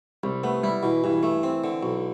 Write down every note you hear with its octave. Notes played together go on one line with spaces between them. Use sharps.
C2 G3
A3 B3
G3 E4
B2 E3
G2 E3
A3
C4
D3
B1